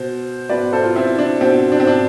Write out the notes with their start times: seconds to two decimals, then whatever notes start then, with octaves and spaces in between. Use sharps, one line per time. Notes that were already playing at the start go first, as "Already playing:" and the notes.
Already playing: B2 C5
0.49 B2 B4 D5
0.73 A4 C5
0.84 F4
0.96 C4 E4
1.19 D4
1.41 B2 C4
1.72 D4
1.80 C4
1.87 D4